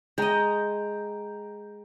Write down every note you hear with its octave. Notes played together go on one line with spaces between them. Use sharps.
G#3 D#5 G5 A#5